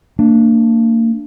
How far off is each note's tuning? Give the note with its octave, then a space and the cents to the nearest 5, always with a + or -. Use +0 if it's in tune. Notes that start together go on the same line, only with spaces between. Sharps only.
A#3 -35 D4 +0